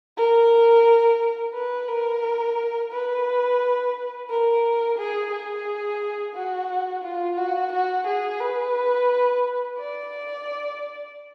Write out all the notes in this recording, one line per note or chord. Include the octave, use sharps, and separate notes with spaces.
A#4
B4
A#4
B4
A#4
G#4
G#4
F#4
F4
F#4
F#4
G#4
B4
D5